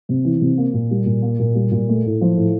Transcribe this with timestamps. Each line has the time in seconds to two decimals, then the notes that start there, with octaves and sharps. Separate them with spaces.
0.09 C3
0.25 E3
0.41 C3
0.58 A#3
0.74 A#2
0.91 G3
1.06 A#2
1.22 A#3
1.39 A#2
1.55 G3
1.72 A#2
1.89 A3
2.05 A2
2.21 F3
2.37 A2